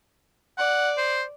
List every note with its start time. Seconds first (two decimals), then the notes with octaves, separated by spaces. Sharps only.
0.58 D5 F#5
0.97 C5